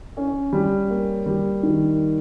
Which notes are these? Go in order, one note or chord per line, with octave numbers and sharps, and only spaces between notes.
C#4
G3
A#3
G3
D#3